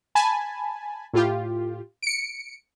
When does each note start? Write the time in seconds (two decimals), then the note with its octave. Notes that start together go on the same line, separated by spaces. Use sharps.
0.15 G#5 A5 B5
1.13 A2 F4 G4
2.03 C#7 D7